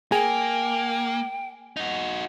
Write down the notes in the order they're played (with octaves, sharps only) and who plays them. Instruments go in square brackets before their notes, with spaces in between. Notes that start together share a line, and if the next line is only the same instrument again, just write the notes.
[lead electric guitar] A#3 [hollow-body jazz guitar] G#4 [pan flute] G5
[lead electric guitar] D#4 F#4